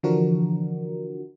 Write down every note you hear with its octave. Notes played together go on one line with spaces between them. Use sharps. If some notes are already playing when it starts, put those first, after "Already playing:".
D3 E3 F3 D4 F#4 A#4